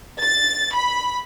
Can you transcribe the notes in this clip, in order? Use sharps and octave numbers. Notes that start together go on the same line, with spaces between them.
A6
B5